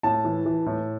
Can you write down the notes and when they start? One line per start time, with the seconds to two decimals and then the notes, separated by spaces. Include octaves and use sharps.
0.03 A2 A5
0.24 E3
0.46 E3
0.66 A2